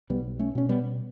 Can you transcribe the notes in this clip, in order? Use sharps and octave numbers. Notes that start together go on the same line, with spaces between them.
B1 G3 B3
A3 C#4
B2 C#4
G3 B3